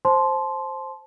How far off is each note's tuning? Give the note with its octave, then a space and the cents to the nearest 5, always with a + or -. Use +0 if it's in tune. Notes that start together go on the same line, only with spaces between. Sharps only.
C5 +10 A5 -25 C6 +0